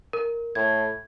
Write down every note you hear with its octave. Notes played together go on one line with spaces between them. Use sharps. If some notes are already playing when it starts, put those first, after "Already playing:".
A#4
A2 G#6